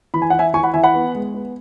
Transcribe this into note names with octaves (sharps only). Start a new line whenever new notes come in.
E3 B5
G#5
E3 F#5
E5 G#5
E3 G#5 C#6
F#5 B5
E3 E5 G#5
F#5 B5
B3
G#3
B3